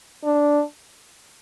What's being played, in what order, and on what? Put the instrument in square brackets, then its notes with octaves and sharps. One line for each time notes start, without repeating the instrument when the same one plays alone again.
[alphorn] D4